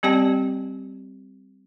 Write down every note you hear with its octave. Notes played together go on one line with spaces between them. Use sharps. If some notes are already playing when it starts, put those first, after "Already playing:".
G3 C4 G4 D5 G5 A5